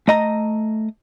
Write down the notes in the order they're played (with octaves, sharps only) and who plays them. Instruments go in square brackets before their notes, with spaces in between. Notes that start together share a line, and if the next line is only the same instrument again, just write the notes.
[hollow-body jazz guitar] A3 D#5 A#5